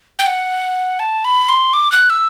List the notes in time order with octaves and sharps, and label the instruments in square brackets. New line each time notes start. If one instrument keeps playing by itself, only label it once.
[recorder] G5
F#5
A5
B5
C6
D6
F#6
E6